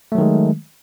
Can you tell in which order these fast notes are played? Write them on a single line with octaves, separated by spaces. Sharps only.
A3 F#3 D#3 G#3